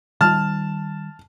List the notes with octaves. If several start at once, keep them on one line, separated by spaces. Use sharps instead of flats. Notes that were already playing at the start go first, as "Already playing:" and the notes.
D#3 G3 A5 F6